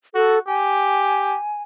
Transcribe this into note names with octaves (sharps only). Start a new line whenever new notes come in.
F#4 A4
G4 G#5